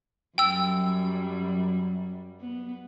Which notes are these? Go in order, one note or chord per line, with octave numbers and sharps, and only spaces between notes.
F#2 F#3 G3 G5 E6
B3